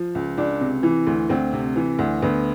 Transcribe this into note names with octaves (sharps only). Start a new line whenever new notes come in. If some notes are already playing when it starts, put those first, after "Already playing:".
Already playing: F3
C#2
C#2 D4
C3
E3
D2
D2 C4
C3
E3
D2
D2 B3